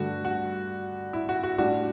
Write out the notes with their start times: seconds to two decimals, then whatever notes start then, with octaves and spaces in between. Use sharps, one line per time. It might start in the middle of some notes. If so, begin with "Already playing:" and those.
Already playing: G2 D3 A3 F#4
0.25 F#4
1.13 E4
1.29 F#4
1.43 F#4
1.58 A2 G3 D4 F#4